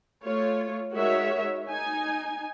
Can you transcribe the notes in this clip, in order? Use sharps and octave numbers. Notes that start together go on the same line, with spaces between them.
A3 F4 C#5
G#3 D#4 F#4 A#4 C#5 E5
D#4 G#5